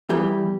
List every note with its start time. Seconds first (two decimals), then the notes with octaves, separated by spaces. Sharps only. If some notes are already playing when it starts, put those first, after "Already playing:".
0.09 E2 E3 G3 G4